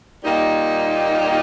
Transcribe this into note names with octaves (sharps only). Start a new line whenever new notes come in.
A#2 G3 A#3 D#4 G4